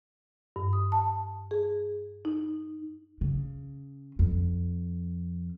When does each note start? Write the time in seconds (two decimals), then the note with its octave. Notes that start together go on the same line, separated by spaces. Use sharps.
0.56 G2
0.73 D#6
0.92 A5
1.51 G#4
2.25 D#4
3.21 C#3
4.19 F2